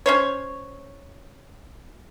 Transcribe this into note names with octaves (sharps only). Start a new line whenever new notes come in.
C#4 C5 C#5